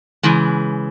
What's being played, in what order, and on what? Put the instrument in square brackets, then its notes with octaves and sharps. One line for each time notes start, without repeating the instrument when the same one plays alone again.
[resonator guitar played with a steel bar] C#3 E3 G#3